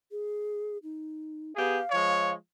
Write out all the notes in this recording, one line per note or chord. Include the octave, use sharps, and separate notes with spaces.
G#4
D#4
B3 G4 G#4 F5
F3 G#3 C#5